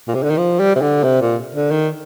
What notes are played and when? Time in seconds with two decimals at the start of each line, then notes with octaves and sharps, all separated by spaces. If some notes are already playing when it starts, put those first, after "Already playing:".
0.08 A#2
0.15 C3
0.23 D3
0.30 D#3
0.37 F3
0.59 G3
0.76 C3
0.82 D3
1.04 C3
1.22 A#2
1.55 D3
1.71 D#3